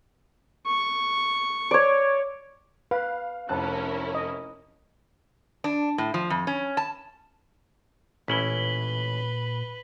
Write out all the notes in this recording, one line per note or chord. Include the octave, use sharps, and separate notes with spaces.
C#6
C#5 D5
B4 F5
F1 C#4 E4 A#4 A5 F#6
D#5
D4
A2
F3
F2
C#4
A5
A1 A#2 C#4 E4 B4 B6 F#7 G7